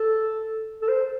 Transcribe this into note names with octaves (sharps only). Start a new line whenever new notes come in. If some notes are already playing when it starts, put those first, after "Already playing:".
Already playing: A4
A4
C5